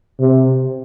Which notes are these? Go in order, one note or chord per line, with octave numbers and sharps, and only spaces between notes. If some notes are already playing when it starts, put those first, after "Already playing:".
C3